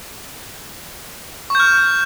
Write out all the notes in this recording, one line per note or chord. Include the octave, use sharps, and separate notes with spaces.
C#6 F6 G6